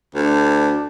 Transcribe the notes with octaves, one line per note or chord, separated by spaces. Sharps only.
D2 D4